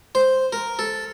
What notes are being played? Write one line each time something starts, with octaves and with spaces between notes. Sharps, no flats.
C5
A#4
A4